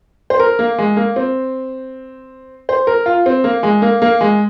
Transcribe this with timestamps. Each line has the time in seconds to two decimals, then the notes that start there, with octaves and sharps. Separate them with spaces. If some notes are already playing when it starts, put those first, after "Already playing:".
0.30 C5
0.40 A#4
0.59 A#3
0.78 G#3
0.97 A#3
1.16 C4
2.69 C5
2.87 A#4
3.06 F4
3.26 C4
3.44 A#3
3.63 G#3
3.82 A#3
4.02 A#3
4.21 G#3